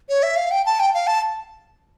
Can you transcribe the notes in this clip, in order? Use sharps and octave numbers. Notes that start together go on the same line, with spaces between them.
C#5
E5
F5
G5
A5
G5
F5
A5